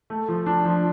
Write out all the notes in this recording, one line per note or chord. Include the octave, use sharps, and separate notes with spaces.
A3
F3
D4
F3